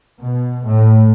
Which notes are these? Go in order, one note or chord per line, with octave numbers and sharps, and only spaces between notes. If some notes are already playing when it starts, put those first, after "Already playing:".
B2
A2